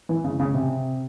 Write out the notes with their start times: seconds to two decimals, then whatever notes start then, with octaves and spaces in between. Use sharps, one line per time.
0.09 E3
0.24 C#3
0.40 C#3
0.54 C3